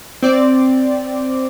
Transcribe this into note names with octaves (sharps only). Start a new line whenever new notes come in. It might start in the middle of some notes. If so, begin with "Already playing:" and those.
C4 D5